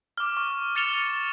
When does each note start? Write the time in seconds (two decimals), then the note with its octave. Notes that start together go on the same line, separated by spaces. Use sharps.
0.18 D6 F6
0.37 C#6
0.76 F6 A6 C#7 E7 F7 G7